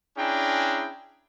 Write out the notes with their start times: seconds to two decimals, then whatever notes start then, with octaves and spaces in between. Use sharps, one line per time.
0.17 C#4 D4 E4 G#4 G5 A#5